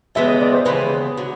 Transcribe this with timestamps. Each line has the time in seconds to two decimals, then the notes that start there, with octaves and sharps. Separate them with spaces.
0.15 D#2 C#3 E3 G#3 B3 E5
0.28 D#5
0.41 D5
0.52 C5
0.65 D#2 C#3 E3 G#3 B3 B4
1.17 D3 F#3